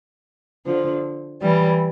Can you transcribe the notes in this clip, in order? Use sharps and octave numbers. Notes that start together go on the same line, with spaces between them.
D3 F3
E3 G3